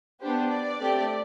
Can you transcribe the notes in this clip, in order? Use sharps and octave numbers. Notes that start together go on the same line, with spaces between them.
B3 D4 G4 C5
D5
A3 C4 G4